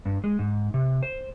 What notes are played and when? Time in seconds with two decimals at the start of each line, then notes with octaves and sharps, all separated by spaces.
0.05 G2
0.24 G#3
0.39 G#2
0.74 C3
1.03 C5